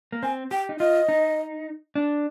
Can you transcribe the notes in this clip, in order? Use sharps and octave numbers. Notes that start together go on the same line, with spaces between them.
A#3
C4 G#5
G4 G5
D#4
F4 D#5
D#4
D4